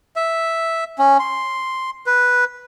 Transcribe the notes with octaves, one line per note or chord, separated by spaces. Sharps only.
E5
C#4
C6
B4